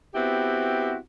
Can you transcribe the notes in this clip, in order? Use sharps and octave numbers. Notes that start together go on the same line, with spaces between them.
B3 C4 E4 F#4 G4